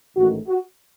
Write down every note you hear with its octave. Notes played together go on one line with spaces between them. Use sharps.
A1 G#2 D#3 A3 F#4
F#4